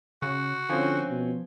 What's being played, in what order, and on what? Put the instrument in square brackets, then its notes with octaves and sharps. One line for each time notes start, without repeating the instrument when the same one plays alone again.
[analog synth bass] C#3 [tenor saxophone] F#4
[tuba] D3 [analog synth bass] F3 [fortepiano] C4 C#4 G#5
[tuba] B2